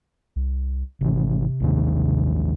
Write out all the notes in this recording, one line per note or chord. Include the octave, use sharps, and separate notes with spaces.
C2
G#1 C3 E3
A1 D#2 D#3